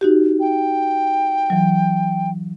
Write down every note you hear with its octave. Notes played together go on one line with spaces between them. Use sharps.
D#4 F#4 G4
G5
E3 F#3